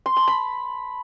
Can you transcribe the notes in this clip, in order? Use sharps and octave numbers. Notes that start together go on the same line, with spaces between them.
C6
A5
B5